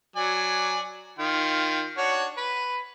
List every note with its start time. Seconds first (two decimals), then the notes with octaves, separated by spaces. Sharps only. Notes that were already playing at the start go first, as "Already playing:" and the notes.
0.16 F#3 D5 G#5
1.19 D#3 F4 G5
1.98 D4 F#4 C#5
2.37 B4